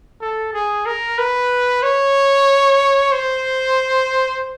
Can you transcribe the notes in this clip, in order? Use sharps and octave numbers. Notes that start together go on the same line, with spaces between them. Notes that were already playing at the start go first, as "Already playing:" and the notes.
A4
G#4
A#4
B4
C#5
C5